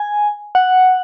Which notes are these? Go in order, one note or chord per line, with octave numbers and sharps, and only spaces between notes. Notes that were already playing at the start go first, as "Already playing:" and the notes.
Already playing: G#5
F#5